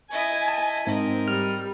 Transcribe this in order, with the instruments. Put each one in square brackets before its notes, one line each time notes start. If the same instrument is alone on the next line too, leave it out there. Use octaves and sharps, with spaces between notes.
[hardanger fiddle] E4 D#5 [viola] G#5
[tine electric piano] A5
[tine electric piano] G#2 [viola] C4 [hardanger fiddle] A#4 D#5
[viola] G3 [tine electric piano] F6